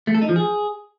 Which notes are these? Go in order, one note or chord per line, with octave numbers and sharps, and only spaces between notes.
A3
A4
D#4
F3
G#4